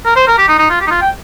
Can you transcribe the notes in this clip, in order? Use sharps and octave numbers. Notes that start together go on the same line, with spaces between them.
A#4
C5
A#4
G4
D#4
D#4
F4
G4
D#4
F4
G5